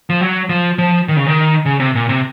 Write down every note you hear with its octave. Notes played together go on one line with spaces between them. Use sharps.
F3
F#3
F3
F3
D#3
C#3
D#3
C#3
C3
A#2
C3